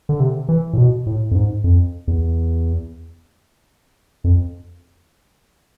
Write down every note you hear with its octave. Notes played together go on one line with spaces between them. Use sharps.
D3
C3
E3
A2
B2
A2
F2
G#2
F2
E2
F2